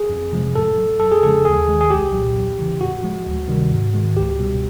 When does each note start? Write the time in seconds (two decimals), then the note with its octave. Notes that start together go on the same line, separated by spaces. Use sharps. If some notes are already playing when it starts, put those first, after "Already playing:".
Already playing: G#4
0.09 F2
0.32 C3 F3 G#3
0.55 A2 A4
0.78 F#3
1.00 F2 A4
1.12 G#4
1.23 C#3 F3 G#3 A4
1.45 D#2 G#4
1.67 D#3 G#3
1.81 G#4
1.90 C2 G4
2.13 A#2 F#3
2.35 E2
2.59 C#3 E3
2.81 A2 F#4
3.03 F3 G#3
3.26 D2
3.48 C3 D#3 G3
3.71 G#2
3.94 D#3 G#3
4.16 C#2 G4
4.39 B2 G3